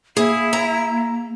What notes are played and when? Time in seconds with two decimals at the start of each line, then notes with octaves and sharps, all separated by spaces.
0.17 A#3 E4 G#4
0.53 A#5